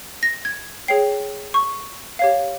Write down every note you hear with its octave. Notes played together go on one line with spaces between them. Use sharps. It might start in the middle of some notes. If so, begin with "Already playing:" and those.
A#6
G#6
G#4 C#5 G5 C7
C#6
G4 C#5 F5